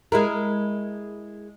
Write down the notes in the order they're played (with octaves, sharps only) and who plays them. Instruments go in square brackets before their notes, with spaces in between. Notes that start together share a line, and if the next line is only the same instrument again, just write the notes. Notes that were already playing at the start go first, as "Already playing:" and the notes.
[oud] G#3 E4 A#4